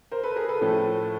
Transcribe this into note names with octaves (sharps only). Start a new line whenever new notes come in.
A#4 C5
A4 B4
G#4 A#4
A4 B4
A2 F3 A3 C#4